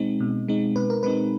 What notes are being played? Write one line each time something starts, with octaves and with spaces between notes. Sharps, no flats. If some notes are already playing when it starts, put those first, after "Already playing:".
Already playing: B2 G#3 C4 D#4
B2
G#3 C4 D#4
B2 B4
A#4
G#3 C4 D#4 B4